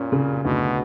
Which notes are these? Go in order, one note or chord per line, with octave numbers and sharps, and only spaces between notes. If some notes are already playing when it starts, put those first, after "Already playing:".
Already playing: A#2 C#4
C#3
D2 B2